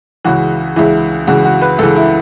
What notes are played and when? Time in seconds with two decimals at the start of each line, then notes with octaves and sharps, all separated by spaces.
0.25 C#2 C#3 E3 F#4
0.76 C#2 C#3 E3 E4
1.27 C#2 C#3 E3 F#4
1.45 F#4
1.62 B4
1.79 C#2 C#3 E3 A4
1.96 E4